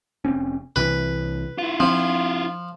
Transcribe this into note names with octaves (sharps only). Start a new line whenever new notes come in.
F1 C4 C#4
C2 C3 E3 B4
E4 F4
F3 C4